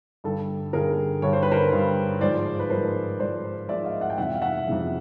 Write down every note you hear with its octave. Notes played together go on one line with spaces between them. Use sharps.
G2 D3 G3 A4
G2 D3 G3 G#4 A#4
G2 D3 G3 C#5
C5
B4
A#4 C5
G2 D3 G3
G#2 F3 G#3 C5 D5
B4
G#2 F3 G#3 A#4 C5
G#2 F3 G#3 C5 D5
G#2 F3 G#3 D5 E5
D#5 F5
E5 F#5
G5
F2 C3 E3 G#3 E5 F#5
F5
E5 F#5
F2 C3 E3 G#3